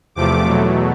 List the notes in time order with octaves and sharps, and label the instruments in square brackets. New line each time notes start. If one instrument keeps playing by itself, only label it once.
[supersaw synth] E2 C3 F3 A3 D6
E2 B2 F#3 A3